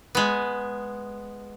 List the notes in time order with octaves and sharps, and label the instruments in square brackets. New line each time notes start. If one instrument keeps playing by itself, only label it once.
[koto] G#3 B3